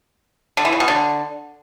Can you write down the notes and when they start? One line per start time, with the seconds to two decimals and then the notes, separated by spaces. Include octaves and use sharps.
0.57 D3
0.65 E3
0.73 C#3
0.80 B2
0.88 D3